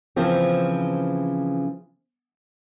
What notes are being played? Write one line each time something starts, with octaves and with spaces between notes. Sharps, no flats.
C#3 E3 F3 A#3 C4